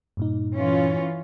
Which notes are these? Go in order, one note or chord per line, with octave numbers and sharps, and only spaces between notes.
G2 A#2 D#4
E3 C#4 F4